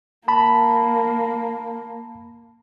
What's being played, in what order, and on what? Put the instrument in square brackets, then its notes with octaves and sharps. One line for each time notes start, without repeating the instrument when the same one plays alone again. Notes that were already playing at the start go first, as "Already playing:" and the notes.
[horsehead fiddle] A#3 [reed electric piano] A5 B5